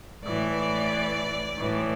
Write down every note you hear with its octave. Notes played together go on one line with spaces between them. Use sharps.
A2 E3 D5
A2 E3